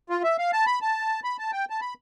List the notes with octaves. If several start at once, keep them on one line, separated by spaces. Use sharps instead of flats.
F4
E5
F5
A5
B5
A5
B5
A5
G5
A5
B5